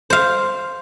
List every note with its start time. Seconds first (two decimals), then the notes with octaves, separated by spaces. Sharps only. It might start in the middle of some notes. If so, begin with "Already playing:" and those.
0.10 C5 F5